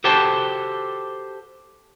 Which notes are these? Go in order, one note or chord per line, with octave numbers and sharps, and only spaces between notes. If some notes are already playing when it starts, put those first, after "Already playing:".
F#4 G4 A4 C5 G5 A5